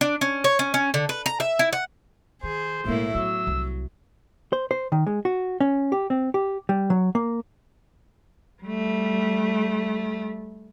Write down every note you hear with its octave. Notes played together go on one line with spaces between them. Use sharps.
D4
C#4
C#5
C#4
C#4
D3
B4
A#5
E5
E4
F#5
D#3 G#4 C5
B1 A2 G#3 A#3 E4
F#3 B3 E6
C2
C5
C5
D#3
G#3
F#4
C#4
G4
C4
G4
G3
F#3
A#3
G3 A3